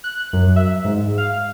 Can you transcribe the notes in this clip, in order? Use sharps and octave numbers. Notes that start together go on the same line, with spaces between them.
F#6
F#2
E5
G#2
F5